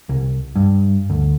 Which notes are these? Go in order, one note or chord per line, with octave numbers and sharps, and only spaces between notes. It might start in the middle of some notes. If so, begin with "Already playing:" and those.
C2
G2
D2